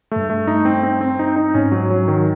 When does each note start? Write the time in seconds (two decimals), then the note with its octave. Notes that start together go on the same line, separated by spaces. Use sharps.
0.11 G2 A3
0.30 A3
0.47 D#4
0.65 C4
0.83 C4
1.01 C4
1.19 D#4
1.36 D#4
1.54 G#2 C#4
1.72 F#3
1.90 F#3
2.08 D#3